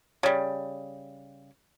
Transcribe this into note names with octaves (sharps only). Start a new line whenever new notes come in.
C#3 G3